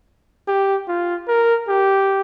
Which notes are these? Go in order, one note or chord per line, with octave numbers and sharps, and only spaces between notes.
G4
F4
A#4
G4